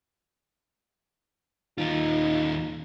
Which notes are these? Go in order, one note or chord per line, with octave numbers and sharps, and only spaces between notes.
D#2 D#4 F4